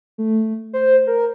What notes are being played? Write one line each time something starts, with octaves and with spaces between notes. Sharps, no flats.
A3
C5
A#4